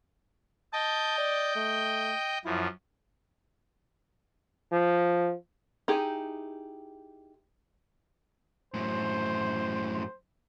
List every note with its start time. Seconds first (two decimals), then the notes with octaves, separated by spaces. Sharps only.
0.73 D#5 G5 A5 G6
1.18 D5
1.55 A3
2.45 F#2 F3 E4
4.72 F3
5.88 D#4 E4 G4 G#4
8.74 F#2 A2 C5